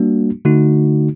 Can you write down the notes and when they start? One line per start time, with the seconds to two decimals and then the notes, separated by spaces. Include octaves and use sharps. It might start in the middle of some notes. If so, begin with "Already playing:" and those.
Already playing: G3 A#3 D4 F#4
0.45 D3 A3 D#4 F#4